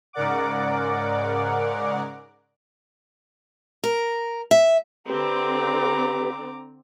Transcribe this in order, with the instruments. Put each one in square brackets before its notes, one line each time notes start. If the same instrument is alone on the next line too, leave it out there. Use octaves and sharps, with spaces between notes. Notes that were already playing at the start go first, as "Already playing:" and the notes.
[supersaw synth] G#2 C#3 A#4 D5 F#5 D6
[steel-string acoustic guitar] A#4
E5
[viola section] D3 C4 [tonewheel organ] G4 B4 [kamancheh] A#5 D6